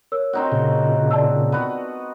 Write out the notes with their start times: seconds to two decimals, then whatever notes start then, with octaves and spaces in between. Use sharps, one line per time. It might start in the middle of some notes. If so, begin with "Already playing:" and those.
0.12 A#4 C#5 E6
0.33 C4 D#4 F#4
0.52 A#2 C#3
1.11 D5 A5 E6
1.52 B3 F#4